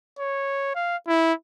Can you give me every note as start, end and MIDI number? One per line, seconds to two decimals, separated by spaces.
0.19 0.71 73
0.75 0.97 77
1.08 1.33 64